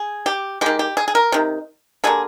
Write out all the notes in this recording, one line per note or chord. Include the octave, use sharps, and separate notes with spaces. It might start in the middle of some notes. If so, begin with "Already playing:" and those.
Already playing: G#4
G4
D#3 G#3 G4
G4
G#4
G#4
A#4
C3 D#3
D3 G3 A#3 G#4